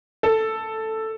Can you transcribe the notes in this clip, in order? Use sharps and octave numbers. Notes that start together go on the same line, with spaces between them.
A4